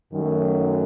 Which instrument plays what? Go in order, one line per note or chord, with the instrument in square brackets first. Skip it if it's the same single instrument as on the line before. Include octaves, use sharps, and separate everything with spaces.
[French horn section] F#2 D#3 F#3 A3